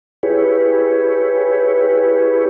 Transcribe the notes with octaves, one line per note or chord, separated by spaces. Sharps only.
E4 G4 G#4 B4 C#5